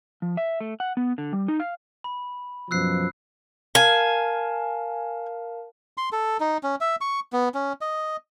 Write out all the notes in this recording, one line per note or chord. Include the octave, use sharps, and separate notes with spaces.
F3
E5
A3
F#5
B3
D3
G3
D#4
F5
B5
F#2 B2 F3 E6 F#6 C7
A#4 F5 G#5 A5
C6
A4
D#4
C#4
E5
C#6
B3
C#4
D#5